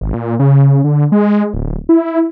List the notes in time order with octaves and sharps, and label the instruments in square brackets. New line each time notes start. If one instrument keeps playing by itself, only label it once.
[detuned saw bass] G#1
A#2
C#3
D3
G#3
D1
E4